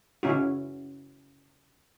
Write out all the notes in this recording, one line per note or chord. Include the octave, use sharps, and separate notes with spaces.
C#3 C#4 E4 F#4